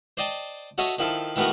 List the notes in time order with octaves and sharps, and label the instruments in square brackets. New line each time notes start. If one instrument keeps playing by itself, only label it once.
[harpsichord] C5 D5 D#5 G5 A5
F#4 A4 C#5 D#5 E5
D#3 F3 E4 A4
D#3 E3 A3 B3 F#4 A#4